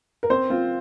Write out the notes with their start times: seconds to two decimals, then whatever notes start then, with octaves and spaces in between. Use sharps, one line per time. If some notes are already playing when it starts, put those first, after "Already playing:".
0.23 A#4
0.30 C4 C5
0.50 C4 F4